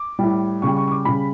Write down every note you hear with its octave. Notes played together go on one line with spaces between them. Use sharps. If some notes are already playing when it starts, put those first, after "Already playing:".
Already playing: D6
A2 G3
C#3 G3 C#6
C#6
C#6
D6
C#3 G3 B5